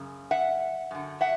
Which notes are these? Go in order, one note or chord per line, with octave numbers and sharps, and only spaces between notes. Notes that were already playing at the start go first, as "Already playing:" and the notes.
Already playing: F#2 C#3
E5 F#5
F#2 D3
E5 F#5